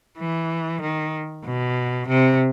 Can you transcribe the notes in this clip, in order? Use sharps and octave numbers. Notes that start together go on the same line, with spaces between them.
E3
D#3
B2
C3